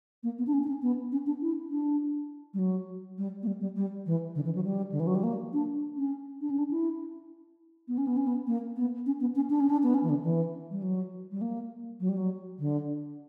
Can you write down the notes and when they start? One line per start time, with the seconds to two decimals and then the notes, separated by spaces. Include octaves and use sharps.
0.23 A#3
0.38 B3
0.47 D4
0.53 C#4
0.63 D4
0.68 C#4
0.82 B3
1.12 C#4
1.27 D4
1.41 E4
1.70 D4
2.54 G3
2.59 F#3
3.18 G3
3.43 A#3
3.47 G3
3.61 G3
3.76 G3
4.06 E3
4.35 D3
4.45 E3
4.55 F#3
4.64 G3
4.92 D3
5.00 E3
5.07 F#3
5.15 G3
5.23 A#3
5.53 D4
5.97 C#4
6.41 D4
6.50 C#4
6.58 D4
6.71 E4
7.88 B3
7.98 C#4
8.07 B3
8.17 C#4
8.27 B3
8.47 A#3
8.76 B3
9.06 C#4
9.21 B3
9.35 C#4
9.50 D4
9.60 C#4
9.70 D4
9.83 B3
9.94 C#4
10.03 E3
10.09 D3
10.24 E3
10.71 G3
10.82 F#3
11.31 G3
11.41 A#3
12.00 F#3
12.09 G3
12.17 F#3
12.59 D3